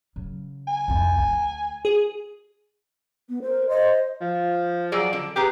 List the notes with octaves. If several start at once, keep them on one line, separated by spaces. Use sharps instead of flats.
C#3 F#3
G#5
C2 F2
D2
G#4
B3
A#4 C5
C5 D#5 C6
F3
F#3 G#4 D5
D3
G4 G#4 B4 A#5